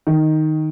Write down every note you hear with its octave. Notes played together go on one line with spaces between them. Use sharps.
D#3